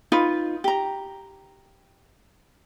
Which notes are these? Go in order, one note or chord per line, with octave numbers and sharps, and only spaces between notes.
D#4 F4 B4
G4 A#5